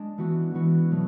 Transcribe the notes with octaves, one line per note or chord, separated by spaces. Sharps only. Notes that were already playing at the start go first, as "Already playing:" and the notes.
Already playing: G#3 D4
E3 B3 F#4
E3 B3 F#4
B2 F#3 A3